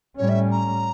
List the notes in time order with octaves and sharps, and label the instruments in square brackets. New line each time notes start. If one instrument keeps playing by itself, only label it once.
[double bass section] A2 G3 C#4 [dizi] C#5
[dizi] E5
A#5